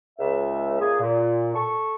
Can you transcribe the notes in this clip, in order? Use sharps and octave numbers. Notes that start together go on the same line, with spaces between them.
C#2 E5
A#2 G#4
A#2
A4 A5 C#6